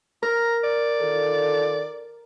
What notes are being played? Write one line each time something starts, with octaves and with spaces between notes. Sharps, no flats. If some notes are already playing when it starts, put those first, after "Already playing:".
A#4 A#5
D5
D#3 F4 A4